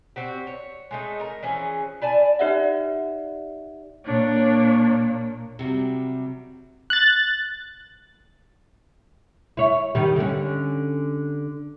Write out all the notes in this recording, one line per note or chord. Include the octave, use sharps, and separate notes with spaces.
C4 F#4 G4
C#5
G#3 A3 D#4
A#4
E3 F3 C#4 G#4
E4 D5 G#5 A5
D#4 G4 D5 E5 F#5
A#2 A#3 D4 C#5
C3 F#3 G3
F#6 A6
E4 C#5
D#3 G3
D3 C#4